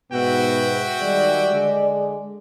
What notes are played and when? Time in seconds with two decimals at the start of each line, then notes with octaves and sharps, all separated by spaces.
0.12 G#2 B2 B3 F#4 E5 G5
1.01 D#3 G3 G#3 D5
1.51 D3 G#3